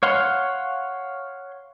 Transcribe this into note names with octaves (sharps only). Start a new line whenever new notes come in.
C#5 F5 F#5 C6